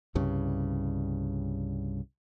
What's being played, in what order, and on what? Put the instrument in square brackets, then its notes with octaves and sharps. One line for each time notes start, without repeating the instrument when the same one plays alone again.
[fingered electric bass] C2 G2 C#3